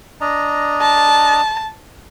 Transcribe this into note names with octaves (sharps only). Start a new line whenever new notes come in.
D4 D#5 A#5
A5